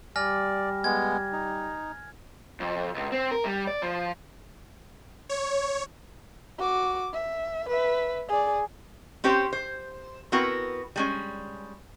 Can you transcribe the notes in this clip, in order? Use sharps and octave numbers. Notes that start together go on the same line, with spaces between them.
G3 D5 G#5 F6 A#6
G#3 B3 G#6
D#4
F2
C#2
C4
A#4
G3
D5
F3
C#5
F#4 D6
E5
B4 E5
G#4 D5
C4 C#4 G4 C5
C5
B3 C4 E4 F#4 A#4
G3 G#3 C#4